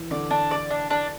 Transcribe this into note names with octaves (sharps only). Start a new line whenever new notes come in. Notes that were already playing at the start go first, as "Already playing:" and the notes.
Already playing: E3
D3 D5
D4
D5
D4
D4